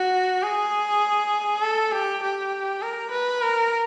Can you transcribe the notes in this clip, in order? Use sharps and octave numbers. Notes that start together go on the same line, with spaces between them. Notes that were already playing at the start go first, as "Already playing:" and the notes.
Already playing: F#4
G#4
A4
G4
G4
A#4
B4
A#4